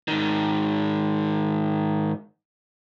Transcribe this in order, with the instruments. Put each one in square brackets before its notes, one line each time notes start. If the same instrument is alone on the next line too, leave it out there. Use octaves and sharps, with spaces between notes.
[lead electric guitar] G#2 D#3